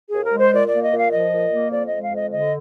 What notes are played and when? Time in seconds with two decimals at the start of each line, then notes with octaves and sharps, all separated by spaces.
0.09 G#4
0.14 D#2
0.24 A#4
0.34 G#3 C5
0.53 A#2 D5
0.68 D5
0.74 A#3
0.83 D#5
0.93 A#2
0.98 F5
1.12 F3 D#5
1.33 A#2
1.52 A#3
1.71 F2 D5
1.87 D#5
1.92 G#3
2.02 F5
2.12 F2 D#5
2.31 D3 D#5